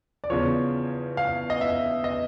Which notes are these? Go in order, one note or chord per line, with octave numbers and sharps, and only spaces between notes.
D5
E2 C#3 F3 C#5
F5
D#5
E5
D#5